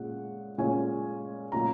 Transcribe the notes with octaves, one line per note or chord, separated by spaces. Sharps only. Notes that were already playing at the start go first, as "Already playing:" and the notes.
Already playing: A#2 G#3 C#4 F#5
A#2 G#3 C#4 G#5
A#2 F#3 C#4 A#5